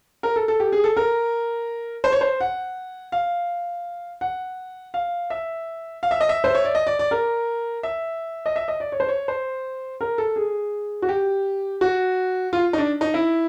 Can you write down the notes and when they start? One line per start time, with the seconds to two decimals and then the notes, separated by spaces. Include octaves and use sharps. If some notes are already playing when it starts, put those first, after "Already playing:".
0.23 A#4
0.36 A4
0.48 A4
0.60 G4
0.72 G#4
0.84 A4
0.97 A#4
2.04 C5
2.12 C#5
2.21 C5
2.41 F#5
3.12 F5
4.21 F#5
4.94 F5
5.30 E5
6.03 F5
6.11 E5
6.21 D#5
6.29 E5
6.44 C5
6.55 C#5
6.65 D5
6.75 D#5
6.87 D5
6.99 D5
7.11 A#4
7.83 E5
8.46 D#5
8.56 E5
8.68 D#5
8.80 D5
8.92 C#5
9.00 C5
9.08 C#5
9.28 C5
10.01 A#4
10.18 A4
10.36 G#4
11.02 F#4
11.09 G4
11.81 F#4
12.53 F4
12.73 D#4
12.78 D4
13.01 D#4
13.14 E4